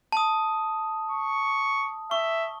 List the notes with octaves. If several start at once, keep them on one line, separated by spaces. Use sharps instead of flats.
A5 D#6
C#6
E5 C#6